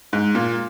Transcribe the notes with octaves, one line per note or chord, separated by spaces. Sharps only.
G#2
A#2